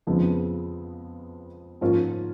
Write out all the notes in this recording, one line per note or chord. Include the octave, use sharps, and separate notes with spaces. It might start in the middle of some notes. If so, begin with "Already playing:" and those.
F2 C#3 F3 G#3 B3
G#2 F3 A#3 C#4 F4